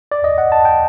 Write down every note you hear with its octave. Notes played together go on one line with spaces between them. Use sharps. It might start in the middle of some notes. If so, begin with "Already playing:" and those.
D5
D#5
F#5
A5
G5